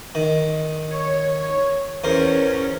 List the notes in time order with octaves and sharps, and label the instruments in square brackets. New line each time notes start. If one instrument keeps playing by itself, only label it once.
[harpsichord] D#3
[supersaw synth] C#5
[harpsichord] E2 A#4 C5 [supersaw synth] C#4